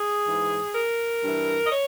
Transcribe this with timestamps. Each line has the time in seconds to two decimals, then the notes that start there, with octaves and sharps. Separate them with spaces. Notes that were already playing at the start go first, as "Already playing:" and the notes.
Already playing: G#4
0.26 G#2 E3
0.75 A#4
1.23 G2 E3
1.66 D#5
1.72 C#5